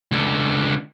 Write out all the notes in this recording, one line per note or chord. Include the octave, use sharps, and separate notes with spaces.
C#2 D3